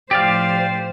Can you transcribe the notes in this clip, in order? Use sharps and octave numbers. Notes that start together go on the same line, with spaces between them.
A2 F3 G4 C5 D5 F5